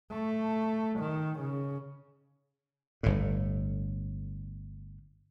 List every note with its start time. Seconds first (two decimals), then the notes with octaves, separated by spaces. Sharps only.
0.11 A3
1.00 D#3
1.39 C#3
3.03 G1 A2